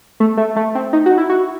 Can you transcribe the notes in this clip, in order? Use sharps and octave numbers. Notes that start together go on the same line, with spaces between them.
A3
A3
A3
C4
D#4
F#4
E4
F#4